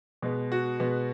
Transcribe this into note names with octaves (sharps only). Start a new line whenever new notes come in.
B2 G#3 B3
F#4
B2 G#3 B3